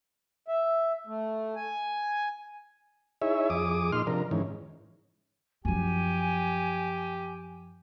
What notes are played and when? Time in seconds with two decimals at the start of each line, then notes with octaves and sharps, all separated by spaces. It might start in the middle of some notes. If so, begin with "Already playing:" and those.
0.48 E5
1.07 A3
1.56 G#5
3.22 D#4 E4 G#4 C#5 E5
3.50 F2 G#4 D6 D#6
3.92 A#2 D#4 C6 F6
4.07 C3 F3 D4 A#4
4.31 G#2 D#3 E3 C#4
5.65 F#2 F3 G4 G#5